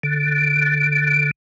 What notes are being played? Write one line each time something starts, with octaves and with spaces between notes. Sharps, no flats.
D3